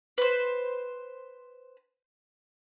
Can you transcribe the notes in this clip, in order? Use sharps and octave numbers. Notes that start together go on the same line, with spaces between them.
B4 C5